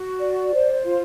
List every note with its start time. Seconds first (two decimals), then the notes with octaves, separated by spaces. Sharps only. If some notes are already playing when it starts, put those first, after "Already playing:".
Already playing: F#4
0.20 D5
0.53 C5
0.85 F4